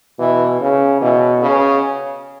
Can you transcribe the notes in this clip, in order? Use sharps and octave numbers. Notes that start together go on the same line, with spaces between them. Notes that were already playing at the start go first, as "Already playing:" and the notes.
B2 E3
C#3
B2 E3
C#3